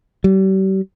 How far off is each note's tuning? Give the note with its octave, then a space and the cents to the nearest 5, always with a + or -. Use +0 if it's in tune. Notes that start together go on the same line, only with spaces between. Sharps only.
G3 -40